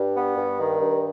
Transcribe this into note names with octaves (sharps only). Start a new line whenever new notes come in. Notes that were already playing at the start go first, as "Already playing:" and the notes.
Already playing: G2
B3
G2
D#3
G2